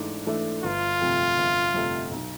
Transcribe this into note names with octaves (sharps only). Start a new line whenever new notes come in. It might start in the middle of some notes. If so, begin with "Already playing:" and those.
Already playing: G#2 E3 A3 D4
E3 A3 D4
G1 F4
F2 C3 F3 A3
G1
F2 C3 F3 A3
B1